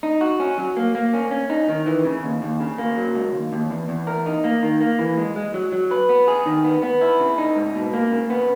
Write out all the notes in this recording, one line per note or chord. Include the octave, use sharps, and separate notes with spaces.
D#4
F#4
C#4
F#3
A#3
A#3
C#4
C#4
D#4
D#3
E3
C#3
D#2
D#2
C#3
A#3
F#3
C#2
D#2
D#2
E2
E2
A#4
D#4
A#3
D#3
A#3
E3
G#3
G#3
F#3
F#3
B4
B3
G#4
D#3
B3
B3
E4
C#3
D#4
G#2
B2
A#3
C#3
B3